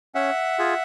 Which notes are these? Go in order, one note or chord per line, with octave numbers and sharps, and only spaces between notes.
C#4 E5 F#5
F4 G#4